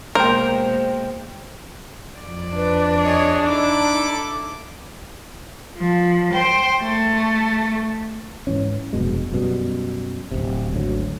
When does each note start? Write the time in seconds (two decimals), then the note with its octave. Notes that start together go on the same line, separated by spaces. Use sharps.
0.15 B2 G#3 A#3 A#4 C5 G5
2.19 F2 D5
2.55 D4 B4
3.04 G#4 C#5 D#5
3.46 D#4 E4 A4 D6
5.77 F3
6.34 C5 G5
6.81 A3
8.47 G#2 E3 C#4
8.93 F1 G2 B2 G#3
9.32 F#2 B2 G3
10.31 D1 G1 C3
10.73 G#1 D2 F#3